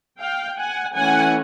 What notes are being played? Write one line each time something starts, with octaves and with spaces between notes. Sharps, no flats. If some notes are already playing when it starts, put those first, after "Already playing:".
F5 G5
F#5 G#5
E3 A3 C#4 F#5 G#5